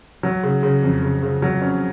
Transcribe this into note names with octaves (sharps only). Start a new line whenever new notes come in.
F#3
C#3
C#3
F2
C#3
C#3
F#3
C#4